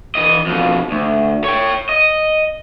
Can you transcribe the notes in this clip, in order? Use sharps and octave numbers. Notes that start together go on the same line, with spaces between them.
E3 D#5
F2 B2
D2
C#5 G5
D#5